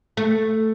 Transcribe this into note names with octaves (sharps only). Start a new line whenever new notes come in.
A3